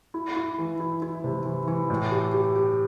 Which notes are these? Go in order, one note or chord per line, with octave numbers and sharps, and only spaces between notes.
E4
E4
E3
E4
E4
C3
E3
E3
A2
G4
G4
G4